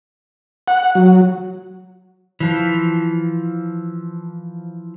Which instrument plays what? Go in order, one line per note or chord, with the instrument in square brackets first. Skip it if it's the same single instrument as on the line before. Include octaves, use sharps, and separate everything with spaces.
[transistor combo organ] F#5
F#3
[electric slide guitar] E3 F3